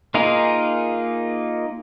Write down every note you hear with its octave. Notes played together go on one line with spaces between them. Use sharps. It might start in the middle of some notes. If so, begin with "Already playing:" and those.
A#3 D#4 F4 G#4 A#4